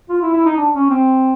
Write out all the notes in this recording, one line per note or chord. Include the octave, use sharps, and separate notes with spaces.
F4
E4
E4
D#4
D4
C#4
C4